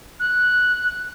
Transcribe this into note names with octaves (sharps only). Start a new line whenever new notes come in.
F#6